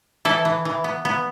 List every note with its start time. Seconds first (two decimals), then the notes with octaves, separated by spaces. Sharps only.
0.25 E3 E4 A4
0.45 E3
0.65 E3
0.84 B3
1.05 B3